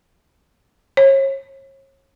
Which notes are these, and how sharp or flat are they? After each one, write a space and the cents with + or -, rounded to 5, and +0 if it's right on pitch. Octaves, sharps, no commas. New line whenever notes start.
C#5 -35